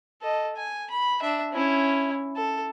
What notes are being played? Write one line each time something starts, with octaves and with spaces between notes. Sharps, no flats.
A4 D#5
G#5
B5
D4 E5
C#4 E4
A4